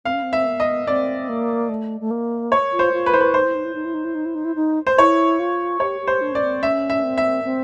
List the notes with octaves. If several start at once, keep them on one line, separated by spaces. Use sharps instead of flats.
C4 F5
C#4
C4
E5
B3
D#5
C4 D5
A#3
A3
A3
A#3
C#5
F4
C5
F4
B4
E4 C5
B4
D#4 C5
E4
D#4
E4
D#4
E4
D#4
E4
D#4
E4
D#4
E4
D#4
C5
E4 C#5
F4
G4 C#5
G4
C5
D4
C#4 D5
C4
C#4 E5
E5
C4
E5
C4